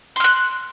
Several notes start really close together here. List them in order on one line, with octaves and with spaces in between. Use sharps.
C6 F6 F#6